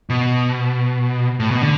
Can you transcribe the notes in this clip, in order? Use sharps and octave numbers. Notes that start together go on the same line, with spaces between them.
B2
A2
B2
D3